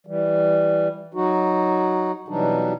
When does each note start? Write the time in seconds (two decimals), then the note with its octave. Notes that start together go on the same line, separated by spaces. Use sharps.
0.06 E3 G3
1.14 F#3 D#4 F#4
2.28 B2 E3 F#3 G3 D4 D#4